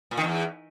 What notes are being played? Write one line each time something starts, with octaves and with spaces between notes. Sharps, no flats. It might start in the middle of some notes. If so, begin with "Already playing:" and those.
A#2
D#3
E2